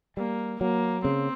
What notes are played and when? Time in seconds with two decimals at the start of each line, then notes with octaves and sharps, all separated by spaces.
0.17 G3 A#3
0.61 F#3 A#3
1.04 C#3 C4